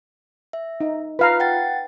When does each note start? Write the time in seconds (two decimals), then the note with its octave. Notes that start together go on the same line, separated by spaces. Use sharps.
0.53 E5
0.80 D#4
1.19 F4 B4 F5 A#5
1.40 F#5 G5 A6